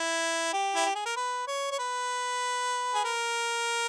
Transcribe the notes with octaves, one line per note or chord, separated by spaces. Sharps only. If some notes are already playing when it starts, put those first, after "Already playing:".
Already playing: E4
G4
E4
G4
G#4
A#4
B4
C#5
C#5
B4
G#4
A#4